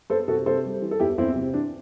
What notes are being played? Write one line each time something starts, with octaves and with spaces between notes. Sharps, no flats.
B3 A4 C5
C3 F#4 A4
C3 A4 C5
G3
E3
A4
E2 E4 G4
E2 C4 E4
C3
E3 D4